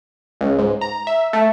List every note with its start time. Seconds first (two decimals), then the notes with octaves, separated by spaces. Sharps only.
0.41 C#2
0.59 G#2
0.81 A#5
1.07 E5
1.33 A3